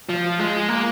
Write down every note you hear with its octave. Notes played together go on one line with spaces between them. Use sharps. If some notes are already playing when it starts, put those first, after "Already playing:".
F3
G#3
A#3